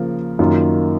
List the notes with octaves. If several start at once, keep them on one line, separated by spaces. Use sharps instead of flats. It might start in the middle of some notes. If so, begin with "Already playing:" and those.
Already playing: C#3 F3 A#3
F#2 D#3 A#3 F4